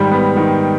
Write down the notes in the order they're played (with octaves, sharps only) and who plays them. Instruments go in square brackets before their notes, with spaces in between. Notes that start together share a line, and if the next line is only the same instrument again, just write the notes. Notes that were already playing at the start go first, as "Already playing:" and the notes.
Already playing: [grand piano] G#2 D#3 G3 B5
B3
D#3